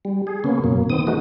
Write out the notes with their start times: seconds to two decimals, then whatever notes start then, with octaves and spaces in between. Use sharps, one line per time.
0.05 G3
0.27 G#4
0.44 C#3 A#3 B3 C#4
0.64 F#2 B2 A#3
0.90 D#3 B3 C4 D#6
1.07 E3 G#3 A3 B3 D#4 F#4